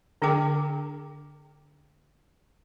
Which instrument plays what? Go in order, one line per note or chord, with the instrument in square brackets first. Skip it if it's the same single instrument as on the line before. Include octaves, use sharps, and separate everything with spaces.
[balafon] D3 D4 G#4 A#4 G5 D6